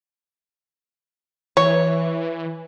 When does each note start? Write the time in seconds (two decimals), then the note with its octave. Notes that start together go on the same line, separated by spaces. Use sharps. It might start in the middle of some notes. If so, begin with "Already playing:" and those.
1.57 E3 C#5